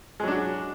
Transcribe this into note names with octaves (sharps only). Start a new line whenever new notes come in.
F#3 G#3 D4 F#4